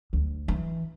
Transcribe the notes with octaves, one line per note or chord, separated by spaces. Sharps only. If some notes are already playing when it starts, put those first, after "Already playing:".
D2
E3